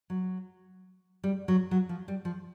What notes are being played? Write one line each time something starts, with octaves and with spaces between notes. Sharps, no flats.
F#3
G3
F#3
F#3
F3
G3
F3